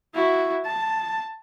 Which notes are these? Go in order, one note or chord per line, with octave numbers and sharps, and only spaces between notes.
E4 F#4
A5